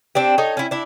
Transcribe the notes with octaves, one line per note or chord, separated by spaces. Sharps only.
C4 D4 G4
D#4 A4 C#5
C#4 E4
D4 E4